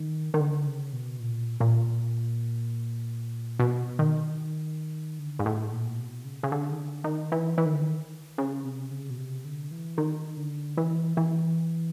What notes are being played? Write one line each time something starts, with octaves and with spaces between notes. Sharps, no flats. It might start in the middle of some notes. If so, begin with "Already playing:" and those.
Already playing: D#3
D#3
D3
C#3
B2
A#2
A#2
B2
D#3
D3
G#2
A2
A#2
B2
C#3
C#3
D3
D#3
D3
D#3
E3
E3
D#3
D3
D#3
C#3
C3
C#3
B2
C3
D3
E3
D#3
D3
E3
E3